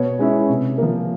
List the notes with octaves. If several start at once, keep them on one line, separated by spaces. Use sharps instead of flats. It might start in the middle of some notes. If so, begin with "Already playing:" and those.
Already playing: B2 B4 C#5
G#3 C#4 E4
C3
F3 A#3